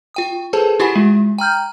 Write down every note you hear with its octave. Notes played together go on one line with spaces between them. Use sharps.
F4 G5 D#6
G#4 A4 B4 C5 A5
E4 F4 G4 F#5 G#5 B5
G#3
G5 A#5 F6 G6